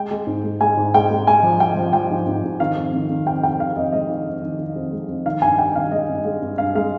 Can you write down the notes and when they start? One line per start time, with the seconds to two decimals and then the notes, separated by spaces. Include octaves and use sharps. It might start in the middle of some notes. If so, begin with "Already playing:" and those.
Already playing: G#3 G5
0.11 G#3
0.27 G#2
0.44 G#3
0.61 G#3 G#5
0.77 G#2
0.94 G#3 G5
1.11 G#3
1.27 G#3 G#5
1.43 F3
1.60 F3 G5
1.77 F3
1.93 F3 G5
2.10 G#2
2.27 G#2
2.43 G#2
2.60 D#3 F5
2.76 F2
2.94 D#3
3.10 D#3
3.26 F2 G5
3.43 F2 G5
3.59 D#3 F5
3.76 F2 D#5
3.92 G#3 D#5
4.10 D#3
4.27 F2
4.43 D#3
4.59 D#3
4.76 F2
4.92 G#3
5.09 F2
5.26 D#3 F5
5.42 G2 G#5
5.58 G2 G5
5.75 D#3 F5
5.92 G#3 D#5
6.09 G2
6.25 G#3
6.42 G2
6.58 G2 F5
6.75 G#3 F5